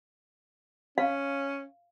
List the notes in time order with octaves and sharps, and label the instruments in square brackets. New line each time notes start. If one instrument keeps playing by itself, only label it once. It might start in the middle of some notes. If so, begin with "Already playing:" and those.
[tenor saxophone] C#4 [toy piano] F5